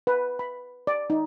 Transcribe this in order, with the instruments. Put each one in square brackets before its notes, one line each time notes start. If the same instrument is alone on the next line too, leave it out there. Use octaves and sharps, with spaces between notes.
[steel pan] B4
B5
D5
D#4